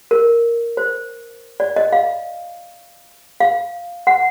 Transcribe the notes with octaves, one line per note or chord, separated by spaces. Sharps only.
A#4
C5
D5
D#5
F5
F5
F#5